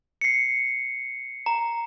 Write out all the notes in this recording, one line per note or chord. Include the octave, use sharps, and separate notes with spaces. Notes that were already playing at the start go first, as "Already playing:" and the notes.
C7 C#7
A#5